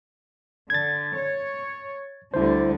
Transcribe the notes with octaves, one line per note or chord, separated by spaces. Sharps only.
D3 G#6 A6
C#5
D2 D3 G3 E4 C5